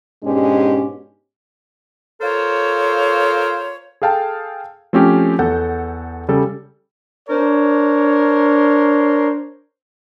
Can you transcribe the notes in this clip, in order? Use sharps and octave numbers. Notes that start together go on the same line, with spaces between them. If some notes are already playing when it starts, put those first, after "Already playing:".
G#2 B2 G#3 C#4 D4 G4
F4 A4 A#4 C5 C#5
G#4 A4 F5 G5 A5
F3 A3 C4 C#4 F#4 G4
E2 A4 F#5 G6
C#3 G3 A4
D4 A#4 C5 C#5